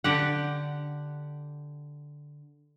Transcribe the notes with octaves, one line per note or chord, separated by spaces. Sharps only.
D3 G4 F#5